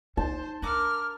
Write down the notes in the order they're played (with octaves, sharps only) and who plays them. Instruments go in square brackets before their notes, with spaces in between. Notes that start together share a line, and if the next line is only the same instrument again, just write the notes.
[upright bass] D4 D#4 [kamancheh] C5 [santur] A5
[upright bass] D4 [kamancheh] A#4 F6 [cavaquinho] F#5 A#5 D6